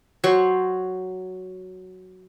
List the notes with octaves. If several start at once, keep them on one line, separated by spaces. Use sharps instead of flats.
F#3 C5 C#6